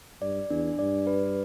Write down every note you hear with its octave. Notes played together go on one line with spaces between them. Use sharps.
G2 D5
E2 D4
G2 D5
B4